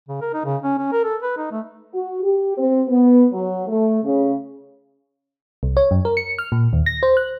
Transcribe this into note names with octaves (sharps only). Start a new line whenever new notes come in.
C#3
A#4
D#4
C#3
C#4
C#4
A#4
A4
B4
D#4
A3
F#4
G4
C4
B3
F#3
A3
C#3
C2
C#5
F#2
A#4
C#7
F6
A#2
D#2
A#6
C5
F#6